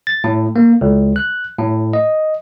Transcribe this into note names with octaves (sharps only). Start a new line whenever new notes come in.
A6
A2
A#3
C#2
F#6
A2
D#5